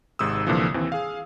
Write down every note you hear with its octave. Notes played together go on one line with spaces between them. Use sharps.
G#1 G#2 C3 D#6 E6
C2 A#2 D3 E3 F3
D#2 E3 C4
G#4 F5